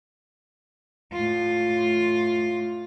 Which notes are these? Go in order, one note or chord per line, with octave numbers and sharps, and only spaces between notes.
A2 F4